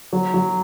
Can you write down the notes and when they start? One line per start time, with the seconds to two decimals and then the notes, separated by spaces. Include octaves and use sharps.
0.13 F#3
0.34 F#3